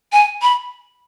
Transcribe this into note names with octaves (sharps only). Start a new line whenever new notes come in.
G#5
B5